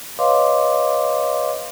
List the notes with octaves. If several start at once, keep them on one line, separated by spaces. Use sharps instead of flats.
B4 C#5 D#5 F5 C6 D6